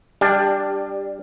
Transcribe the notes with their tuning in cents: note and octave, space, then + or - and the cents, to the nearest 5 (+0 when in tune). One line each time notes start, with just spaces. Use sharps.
G3 +20 D4 +0 G4 +0